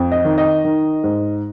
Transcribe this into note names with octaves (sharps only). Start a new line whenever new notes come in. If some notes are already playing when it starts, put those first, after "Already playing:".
Already playing: F2
D#5
D#3
D#5
D#3
G#2